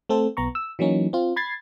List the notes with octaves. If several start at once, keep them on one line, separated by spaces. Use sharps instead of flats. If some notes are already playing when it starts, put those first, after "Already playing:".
A3 C4 A4 C5
B1 B3 A#5 C#6
E6
E3 F#3 A#3 C#4 D#4
C4 F4
B5 G#6 A6 C7